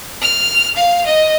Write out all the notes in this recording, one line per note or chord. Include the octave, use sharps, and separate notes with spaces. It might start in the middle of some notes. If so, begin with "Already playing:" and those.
F6
F5
D#5